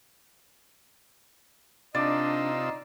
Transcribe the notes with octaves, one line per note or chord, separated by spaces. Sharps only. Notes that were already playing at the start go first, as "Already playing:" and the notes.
C3 D4 D#4 F4 D5 D#5 E6